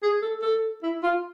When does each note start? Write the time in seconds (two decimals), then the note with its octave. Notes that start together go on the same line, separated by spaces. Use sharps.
0.03 G#4
0.22 A4
0.42 A4
0.83 E4
1.03 F4